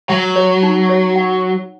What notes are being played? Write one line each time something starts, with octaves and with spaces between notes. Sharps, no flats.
F#3 F#5
C#5
D#4
C#5
F#5